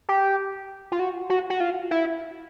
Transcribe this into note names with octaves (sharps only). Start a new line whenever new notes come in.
G4
F4
F#4
F#4
F#4
F4
E4